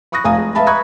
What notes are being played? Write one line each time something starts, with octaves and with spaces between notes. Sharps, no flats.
B5 C#6 D#6 F#6 A#6
F1 F5 G#5 A#5 D#6
G#3
B4 E5 F5 A5 B5
A#5 B5 C#6 D#6 F#6 G#6